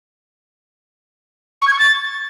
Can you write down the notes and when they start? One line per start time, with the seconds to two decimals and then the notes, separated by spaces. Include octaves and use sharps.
1.61 C#6
1.67 G#6
1.72 C#6
1.78 A6